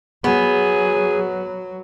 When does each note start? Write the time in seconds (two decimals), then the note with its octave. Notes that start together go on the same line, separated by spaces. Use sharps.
0.24 F#3 B3 G#4